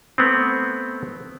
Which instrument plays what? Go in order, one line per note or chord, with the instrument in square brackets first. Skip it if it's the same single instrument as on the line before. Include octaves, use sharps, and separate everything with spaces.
[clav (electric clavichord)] A3 B3 C4